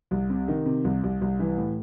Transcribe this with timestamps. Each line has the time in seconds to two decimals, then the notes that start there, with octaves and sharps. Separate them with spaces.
0.11 C2
0.30 C3
0.48 D#3
0.66 C3
0.84 C2
1.03 C2
1.21 C2
1.39 E3
1.57 A2